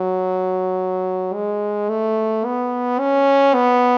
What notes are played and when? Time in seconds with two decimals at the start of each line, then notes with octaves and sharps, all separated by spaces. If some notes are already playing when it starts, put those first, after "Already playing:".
Already playing: F#3
1.34 G#3
1.89 A3
2.45 B3
3.00 C#4
3.54 B3